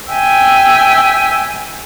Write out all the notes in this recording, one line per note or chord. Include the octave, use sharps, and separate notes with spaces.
E5 G5 G#5